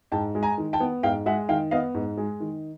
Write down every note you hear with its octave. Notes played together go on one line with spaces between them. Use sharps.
G#2 G5 A5
G#3
G#5 A#5
D#3
G5 A5
B3
G#2 F5 G5
G#3 E5 F#5
D#3 F5 G5
B3 D#5 F5
G#2
G#3
D#3